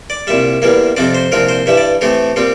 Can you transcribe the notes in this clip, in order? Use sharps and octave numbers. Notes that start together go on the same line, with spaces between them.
D5
C2 A#2 G3 E5
E2 E3 G3 A#3
F2 C3 F3 C4 D5
C5
C2 A#2 F3 C4 A#4
C5
G2 E3 G3 E5
D5
A2 E3 A3 C4 G4
A#2 G3 C4